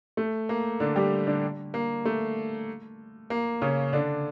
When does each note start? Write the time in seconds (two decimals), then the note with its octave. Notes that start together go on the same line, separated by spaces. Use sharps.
0.17 A3
0.49 A#3
0.80 D3 D4
0.96 G3 G4
1.27 D3 D4
1.74 A#3
2.05 A3
3.30 A#3
3.62 C#3 C#4
3.93 D3 D4